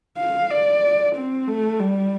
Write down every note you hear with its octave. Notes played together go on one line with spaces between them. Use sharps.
F5
D5
C4
A3
G3